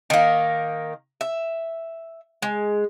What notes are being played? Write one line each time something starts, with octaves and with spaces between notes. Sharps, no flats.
D#3 A#3
E5
G#3